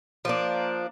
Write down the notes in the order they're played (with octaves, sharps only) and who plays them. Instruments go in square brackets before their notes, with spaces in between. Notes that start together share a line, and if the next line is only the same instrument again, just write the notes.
[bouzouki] F3 A#3 D4